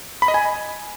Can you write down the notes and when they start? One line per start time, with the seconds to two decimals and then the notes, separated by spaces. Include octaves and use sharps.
0.22 B5
0.28 D#5
0.34 G#5